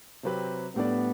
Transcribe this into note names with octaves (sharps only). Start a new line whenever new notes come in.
C3 F#3 C4 G4 B4
A2 G3 B3 D4 A4 D5